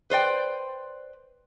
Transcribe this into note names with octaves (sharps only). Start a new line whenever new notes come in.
B4 C5 D5 G5